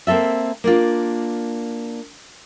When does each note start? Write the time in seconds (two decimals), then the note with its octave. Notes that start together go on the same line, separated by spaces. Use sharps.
0.07 A#3 C4 C#4 A4 E5
0.64 A#3 D4 F4